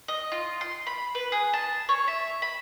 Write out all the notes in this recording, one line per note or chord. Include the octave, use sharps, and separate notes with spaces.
D#5
F4
C6
B5
B4
G#4
A5
C#5
E5
B5